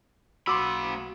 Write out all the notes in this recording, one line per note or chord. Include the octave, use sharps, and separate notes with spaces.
B1 A#3 F#4 B5 C6 D6 E6